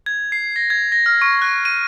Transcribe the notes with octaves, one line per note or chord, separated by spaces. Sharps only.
G#6
C7
A#6
G#6
A#6
F6
C#6
F#6
D#7